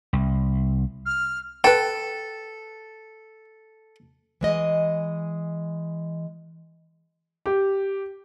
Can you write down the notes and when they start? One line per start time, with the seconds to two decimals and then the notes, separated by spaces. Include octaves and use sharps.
0.13 C2
1.06 F6
1.64 A4 B4 G5
4.41 E3 G#3 D#5
7.46 G4